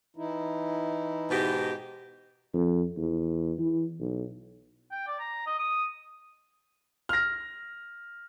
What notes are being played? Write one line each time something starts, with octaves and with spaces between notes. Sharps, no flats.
E3 D#4 E4
G#2 B2 G4
F2
E2
E3
B1
G5
D5
A#5
D#5
D#6
F6 A#6